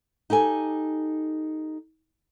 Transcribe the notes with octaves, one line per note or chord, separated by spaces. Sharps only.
D#4 G4 A4 G#5